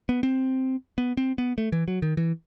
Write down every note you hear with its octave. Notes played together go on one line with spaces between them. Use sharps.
B3
C4
B3
C4
B3
A3
E3
F#3
D#3
E3